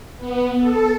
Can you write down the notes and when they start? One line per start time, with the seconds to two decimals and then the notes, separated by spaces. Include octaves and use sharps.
0.18 B3
0.58 A4